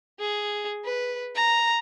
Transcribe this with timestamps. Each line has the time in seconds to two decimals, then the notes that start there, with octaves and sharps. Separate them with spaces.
0.19 G#4
0.85 B4
1.35 A#5